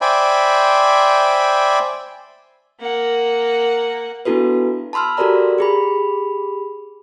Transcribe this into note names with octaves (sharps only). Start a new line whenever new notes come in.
C5 D5 E5 G5 G#5 B5
A#3 F#5
B3 D4 E4 F#4 A4 B4
A5 B5 C6 E6 F6
F#4 G4 A4 A#4 D5 A#5
G4 G#4 B5